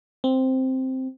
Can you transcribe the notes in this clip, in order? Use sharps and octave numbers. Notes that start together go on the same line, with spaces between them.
C4